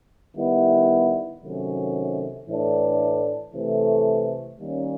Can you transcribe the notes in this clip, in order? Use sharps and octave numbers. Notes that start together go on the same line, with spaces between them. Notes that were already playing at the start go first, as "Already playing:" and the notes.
D#3 G3 B3 E4
C3 D#3 F#3 A3 C#4
A2 E3 A3 D4
C3 E3 A3
D#3 G3 A#3 C#4